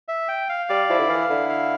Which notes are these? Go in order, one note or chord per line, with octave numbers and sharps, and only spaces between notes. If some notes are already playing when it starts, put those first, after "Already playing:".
E5
G5
F5
G3 D5
F3 E4
D3
E3 F5
D3 E4
F5